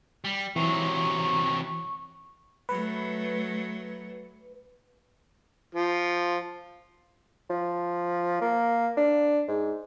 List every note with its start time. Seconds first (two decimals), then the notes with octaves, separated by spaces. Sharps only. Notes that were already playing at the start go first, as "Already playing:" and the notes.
0.24 G3
0.56 C3 E3 F#3 C#6
2.69 F#3 A3 B4
5.75 F3
7.50 F3
8.41 A#3
8.97 D4
9.48 G#2